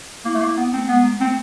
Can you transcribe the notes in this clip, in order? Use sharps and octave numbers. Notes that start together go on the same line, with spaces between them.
A#3 E4
A3
A#3
A#3 B3
A3 C4
G#3 B3
A#3
A3 C4